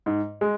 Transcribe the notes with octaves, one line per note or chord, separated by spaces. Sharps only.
G#2
G#3